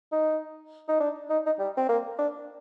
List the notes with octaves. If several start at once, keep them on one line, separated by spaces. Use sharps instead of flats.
D#4
D#4
D4
D#4
D#4
G3
C4
A#3
D4